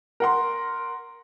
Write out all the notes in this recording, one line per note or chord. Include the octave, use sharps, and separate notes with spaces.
A#4 F#5 C6